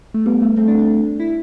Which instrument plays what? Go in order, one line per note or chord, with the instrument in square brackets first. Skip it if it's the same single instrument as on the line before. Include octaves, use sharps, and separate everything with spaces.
[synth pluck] A3
[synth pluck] G3 [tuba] B3
[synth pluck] A3
[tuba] A3 [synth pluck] C4
[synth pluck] D4
D4
E4